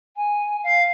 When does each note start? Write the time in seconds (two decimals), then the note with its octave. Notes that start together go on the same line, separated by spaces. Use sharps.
0.16 G#5
0.63 F5